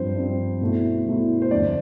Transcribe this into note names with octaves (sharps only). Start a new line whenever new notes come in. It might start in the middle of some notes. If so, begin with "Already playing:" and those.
Already playing: G2 F3 C4 C5
G2 F3 C4
B2 A3 E4
B2 A3 E4
C5
F2 D3 A3 D5